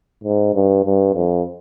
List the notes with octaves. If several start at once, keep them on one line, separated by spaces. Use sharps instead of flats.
G#2
G2
G2
F2